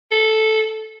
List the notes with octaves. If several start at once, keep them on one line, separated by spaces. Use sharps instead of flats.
A4